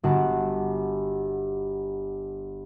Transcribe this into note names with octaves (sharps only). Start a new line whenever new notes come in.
G1 F#4 F#5 A5